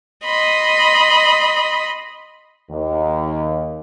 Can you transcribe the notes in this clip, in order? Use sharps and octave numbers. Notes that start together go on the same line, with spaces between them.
D#5 B5 C6
D#2